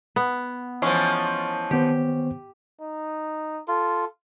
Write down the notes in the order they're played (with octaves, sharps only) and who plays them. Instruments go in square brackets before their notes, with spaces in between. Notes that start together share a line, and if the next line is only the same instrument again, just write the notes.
[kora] B3
[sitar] E3 F3 [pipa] G#3 C#4
[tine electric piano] D#3 B3 C5 [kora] G4
[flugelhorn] D#4
[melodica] F4 [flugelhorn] A4